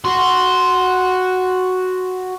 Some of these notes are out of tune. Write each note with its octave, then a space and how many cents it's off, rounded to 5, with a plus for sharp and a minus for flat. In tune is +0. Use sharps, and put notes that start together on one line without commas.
F#4 +0 C6 +0